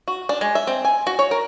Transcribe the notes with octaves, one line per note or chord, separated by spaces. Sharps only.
F#4
D4
G#3
E5
C4
G#5
F#4
C#5
A#4